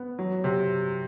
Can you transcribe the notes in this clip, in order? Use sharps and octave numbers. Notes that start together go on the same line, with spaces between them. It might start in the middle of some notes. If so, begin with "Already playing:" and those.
Already playing: B3
F#3
C3